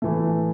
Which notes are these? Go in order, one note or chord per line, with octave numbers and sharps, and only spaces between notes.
A2 E3 A3